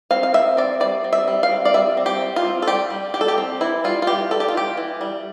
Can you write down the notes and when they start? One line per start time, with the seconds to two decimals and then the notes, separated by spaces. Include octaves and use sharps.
0.11 C4 F5
0.23 F5
0.34 C4 E5
0.57 C4 D5
0.80 G3 D5
1.04 C4
1.13 E5
1.28 G3
1.43 F5
1.52 C4
1.65 D5
1.74 G3 E5
1.97 C4
2.06 G4
2.21 G3
2.36 F4
2.45 C4
2.62 A4
2.68 G3 G4
2.90 G3
3.14 G3 G4
3.21 A4
3.28 G4
3.38 C4
3.61 E3 E4
3.84 G3 F4
4.02 F4
4.07 E3 G4
4.31 G3 A4
4.40 G4
4.48 F4
4.54 E3 G4
4.77 E3
5.01 G3